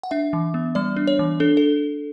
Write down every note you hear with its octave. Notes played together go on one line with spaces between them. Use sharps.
F#5
D4 E5
E3
B3
G3 D5
D4
C#5
E3
D4 A4
A4